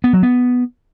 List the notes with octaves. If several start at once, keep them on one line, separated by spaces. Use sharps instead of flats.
B3
F#3
B3